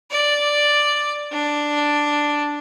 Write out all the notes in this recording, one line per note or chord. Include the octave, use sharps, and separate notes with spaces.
D5
D4